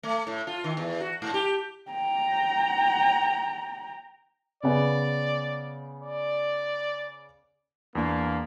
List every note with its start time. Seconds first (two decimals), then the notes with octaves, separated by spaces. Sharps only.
0.03 A3
0.27 A2
0.47 F4
0.64 D#3
0.77 E2
1.00 F#4
1.22 G#2
1.34 G4
1.91 G5 A#5
4.63 C#3 B3 D5
6.03 D5
7.95 E2 A#3 D4